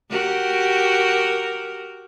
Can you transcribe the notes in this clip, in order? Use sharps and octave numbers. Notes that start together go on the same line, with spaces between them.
F#4 G4 A#4